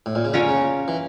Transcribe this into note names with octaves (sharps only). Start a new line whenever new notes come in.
A2
A#2
C#3
D3 C#4 F4 A#4 C#5
C#3
E3